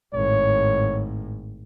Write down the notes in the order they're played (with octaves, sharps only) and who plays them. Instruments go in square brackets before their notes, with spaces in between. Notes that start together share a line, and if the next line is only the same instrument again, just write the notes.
[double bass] G#1 A2 [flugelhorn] C#5